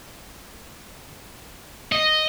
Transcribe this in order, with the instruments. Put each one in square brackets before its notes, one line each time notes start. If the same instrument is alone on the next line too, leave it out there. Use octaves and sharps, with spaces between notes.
[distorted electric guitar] D#5